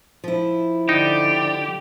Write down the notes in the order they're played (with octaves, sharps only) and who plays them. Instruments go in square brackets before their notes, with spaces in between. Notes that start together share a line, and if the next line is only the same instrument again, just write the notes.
[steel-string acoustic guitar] F3 E4
[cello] D3 D5 [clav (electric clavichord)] D#4 [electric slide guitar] G4